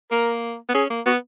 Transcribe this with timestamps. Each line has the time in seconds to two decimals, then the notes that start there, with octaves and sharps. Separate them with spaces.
0.11 A#3 A#4
0.69 B3
0.74 C#4 G#4
0.90 A#3
1.06 B3 F#4